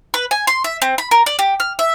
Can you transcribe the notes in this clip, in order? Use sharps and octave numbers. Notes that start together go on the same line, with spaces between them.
B4
G#5
C6
E5
C4
B5
A#4
D5
G4
F6
E5